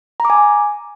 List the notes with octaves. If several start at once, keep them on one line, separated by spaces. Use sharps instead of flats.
A#5
D6
G#5